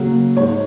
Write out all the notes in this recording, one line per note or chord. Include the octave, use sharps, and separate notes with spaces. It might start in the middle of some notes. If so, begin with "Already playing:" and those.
Already playing: C#3 F#3 A#3
G#2 G#3 C#5